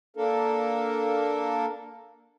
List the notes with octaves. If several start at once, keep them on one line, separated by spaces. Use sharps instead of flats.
A#3 D4 A4 A#4